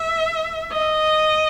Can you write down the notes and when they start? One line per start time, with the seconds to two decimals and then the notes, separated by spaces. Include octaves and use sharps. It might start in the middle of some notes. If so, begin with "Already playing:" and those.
Already playing: E5
0.72 D#5